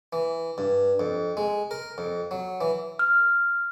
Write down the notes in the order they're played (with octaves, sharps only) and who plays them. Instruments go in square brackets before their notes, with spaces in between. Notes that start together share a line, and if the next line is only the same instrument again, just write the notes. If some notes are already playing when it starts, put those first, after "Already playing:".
[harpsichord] E3
G2
F2
G#3
A#4
F2
F#3
E3
[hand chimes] F6